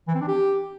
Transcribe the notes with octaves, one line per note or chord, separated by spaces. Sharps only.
E3
C4
D4
G4